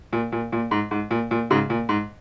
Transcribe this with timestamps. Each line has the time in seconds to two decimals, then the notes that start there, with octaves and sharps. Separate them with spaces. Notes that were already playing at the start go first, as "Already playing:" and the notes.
0.13 A#2
0.32 A#2
0.52 A#2
0.71 G#2
0.91 G#2
1.11 A#2
1.31 A#2
1.50 G#2 C#3
1.70 A#2
1.89 G#2